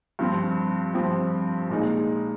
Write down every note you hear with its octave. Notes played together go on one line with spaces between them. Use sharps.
G2 F3 C4
G2 F3 C4
A#2 G#3 D#4